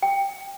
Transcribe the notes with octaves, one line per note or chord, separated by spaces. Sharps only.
G5